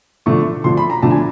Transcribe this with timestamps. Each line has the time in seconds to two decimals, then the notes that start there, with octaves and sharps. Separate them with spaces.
0.26 D3 F3 A3 D4 C#6
0.64 D3 F3 A3 D4 C6
0.77 B5
0.90 A#5
1.02 D3 F3 A3 D4 A5
1.11 G#5